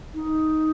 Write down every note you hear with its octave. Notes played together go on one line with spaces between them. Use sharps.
D#4